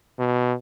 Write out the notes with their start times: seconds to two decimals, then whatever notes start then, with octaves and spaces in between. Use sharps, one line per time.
0.19 B2